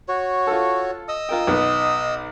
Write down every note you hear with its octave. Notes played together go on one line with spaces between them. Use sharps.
F#4 C#5
F4 A4
D#5 D#6 E6
F4 A#4 G5
B1 B3 B4